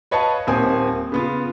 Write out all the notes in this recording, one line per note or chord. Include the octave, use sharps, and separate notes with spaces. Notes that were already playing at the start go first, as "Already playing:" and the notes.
B4 C#5 D#5 F5 A5
D#1 A#3 C4 G#5 D#6
C#3 B3 F4